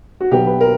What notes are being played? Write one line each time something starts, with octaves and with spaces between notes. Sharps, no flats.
F#4
B1 B2 F#3 B3 G4
B4
A#4